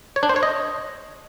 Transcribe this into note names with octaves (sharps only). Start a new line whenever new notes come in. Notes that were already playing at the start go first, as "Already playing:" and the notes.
C#5
D4
C5
C#5
D#5